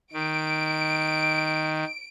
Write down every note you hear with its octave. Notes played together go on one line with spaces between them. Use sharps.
D#3 D7